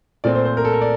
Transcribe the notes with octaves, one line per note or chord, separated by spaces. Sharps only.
A#2 A3 C4 D5
C5
C5
A#4
A4
A#4
D5